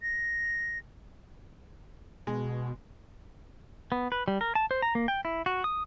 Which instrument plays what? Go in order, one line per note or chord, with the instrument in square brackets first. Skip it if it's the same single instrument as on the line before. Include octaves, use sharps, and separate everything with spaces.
[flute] A#6
[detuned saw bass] B2 [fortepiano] G#3
[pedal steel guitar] B3
B4
G3
A#4
A5
C5
A#5
A#3
G5
E4
F#4
D#6